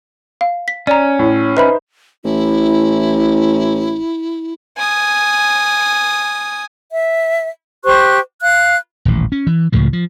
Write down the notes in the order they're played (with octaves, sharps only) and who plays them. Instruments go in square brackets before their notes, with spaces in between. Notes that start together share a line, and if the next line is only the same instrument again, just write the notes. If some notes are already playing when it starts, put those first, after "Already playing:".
[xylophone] F5
B6
[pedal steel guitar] C#4 [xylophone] D5 A#5
[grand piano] A2
[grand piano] D#4 C5 [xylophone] B4 E5 B5
[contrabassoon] A1 [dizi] E4
[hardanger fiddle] G#5 D#6
[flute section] E5
G4 C5 C#6 F#6
F5 F#6
[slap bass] D#1 A1
C#4
E3
C#2 A2 C#3 F3
F3